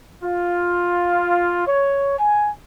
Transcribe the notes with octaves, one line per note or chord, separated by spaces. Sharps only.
F4
C#5
G#5